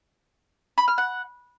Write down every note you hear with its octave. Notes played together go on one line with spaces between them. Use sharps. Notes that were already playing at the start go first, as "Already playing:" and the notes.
B5
F6
F#5